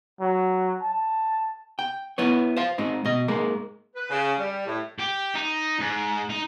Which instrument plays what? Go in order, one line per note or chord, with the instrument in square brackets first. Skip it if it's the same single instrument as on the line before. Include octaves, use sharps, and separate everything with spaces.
[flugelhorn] F#3
A5
[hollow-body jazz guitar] G5
B3 E4 B4 C#5
C5 F5
G#2 C4 D#4
B2 D#5
G#2 G#3 A#3
[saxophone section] B4
C#3
G3
A2
[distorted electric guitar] G4
D#4
G#2
D#4